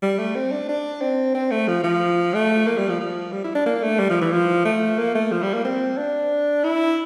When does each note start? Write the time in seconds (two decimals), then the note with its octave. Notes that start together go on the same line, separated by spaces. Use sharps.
0.03 G3
0.19 A3
0.35 C4
0.52 D4
0.69 D4
1.02 C4
1.35 C4
1.51 A3
1.68 F3
1.84 F3
2.34 A3
2.67 A#3
2.78 G3
2.89 F3
3.00 F3
3.33 G3
3.44 E4
3.55 D4
3.66 A#3
3.83 A3
3.99 G3
4.10 F3
4.21 E3
4.32 F3
4.65 A3
4.99 A#3
5.15 A3
5.32 F3
5.43 G3
5.54 A#3
5.65 C4
5.98 D4
6.64 E4